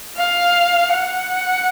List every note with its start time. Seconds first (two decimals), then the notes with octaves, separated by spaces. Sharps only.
0.17 F5
0.95 F#5